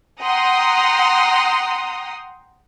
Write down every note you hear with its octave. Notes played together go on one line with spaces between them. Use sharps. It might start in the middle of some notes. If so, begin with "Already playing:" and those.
F#5 G5 A#5 C6 D#6